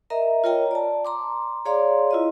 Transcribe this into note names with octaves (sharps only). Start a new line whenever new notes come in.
A#4 D#5 E5 A#5
F4 A#4 C#5 D#5 G5 A#5
D5 A5
A#5 C6 D6
G#4 C#5 D5 F5 A#5 C6
E4 F4 D#5